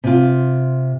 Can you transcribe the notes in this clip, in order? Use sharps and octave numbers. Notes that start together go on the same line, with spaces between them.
C3 F4